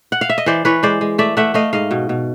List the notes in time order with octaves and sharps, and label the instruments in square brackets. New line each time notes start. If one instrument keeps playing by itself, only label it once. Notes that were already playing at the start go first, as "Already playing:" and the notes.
[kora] F#5
F5
E5
D#5
E3 C5 D5
E3 B4 C#5
G#3 C5 D5
G#3
A3 D5 E5
A3 E5 F#5
A3 D#5 F5
G#2 D#5 F5
B2
B2